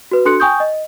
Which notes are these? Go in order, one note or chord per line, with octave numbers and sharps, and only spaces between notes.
F#4 B4
D4 F#4 A4 C6 F#6 C#7
G5 G#5 C#6 D#6 G6
D#5